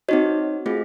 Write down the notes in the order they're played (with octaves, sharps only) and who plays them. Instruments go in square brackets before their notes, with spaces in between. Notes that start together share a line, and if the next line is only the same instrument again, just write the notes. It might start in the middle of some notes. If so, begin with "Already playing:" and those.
[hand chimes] C4 D#4 F#4 C#5 D#5
A3 C4 F4 G#4